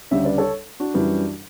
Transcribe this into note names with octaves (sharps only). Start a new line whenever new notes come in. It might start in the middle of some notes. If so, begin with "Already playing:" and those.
D2 C#3 G3 C#5 E5
B4 D5
A4 C#5
D4 F#4
F#2 E3 G3